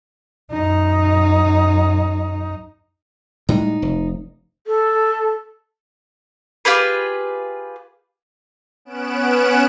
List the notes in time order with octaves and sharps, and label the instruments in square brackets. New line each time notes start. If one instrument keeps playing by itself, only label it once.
[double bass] F#2 D#4
[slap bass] A2 G3 G#3 [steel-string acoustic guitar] D#4
[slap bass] F1
[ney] A4
[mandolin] F4 G4 G#4 B4
[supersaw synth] B3 C#4 F#6 D7 E7